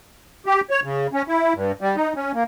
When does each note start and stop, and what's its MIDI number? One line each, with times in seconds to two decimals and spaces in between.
0.46 0.61 67
0.70 0.80 73
0.84 1.07 49
1.13 1.22 61
1.28 1.53 64
1.54 1.72 43
1.81 1.96 55
1.96 2.13 63
2.16 2.32 61
2.34 2.43 58